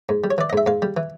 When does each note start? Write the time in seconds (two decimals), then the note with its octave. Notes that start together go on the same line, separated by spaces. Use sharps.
0.09 G#2
0.24 G3
0.31 C#5
0.38 E3 D5
0.50 G#2 D#5
0.57 E5
0.66 G#2 F5
0.82 G3
0.97 E3